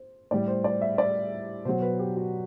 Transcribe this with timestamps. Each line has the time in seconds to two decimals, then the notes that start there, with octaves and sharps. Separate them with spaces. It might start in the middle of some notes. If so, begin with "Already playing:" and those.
Already playing: C5
0.31 A2 G3 D5
0.48 C5
0.64 D5
0.81 E5
0.98 D5
1.65 B2 F#3 C5
1.82 B4
1.99 G4
2.16 F#4